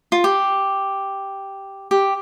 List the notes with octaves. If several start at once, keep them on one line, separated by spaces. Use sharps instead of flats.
F4
G4
G4